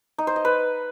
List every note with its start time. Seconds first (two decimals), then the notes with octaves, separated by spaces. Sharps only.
0.18 D#4
0.27 C5
0.36 D#5
0.45 B4